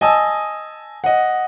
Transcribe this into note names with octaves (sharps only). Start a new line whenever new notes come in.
D#5 G#5 A5 D#6 E6
D#5 F#5